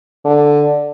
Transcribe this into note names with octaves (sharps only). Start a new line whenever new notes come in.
D3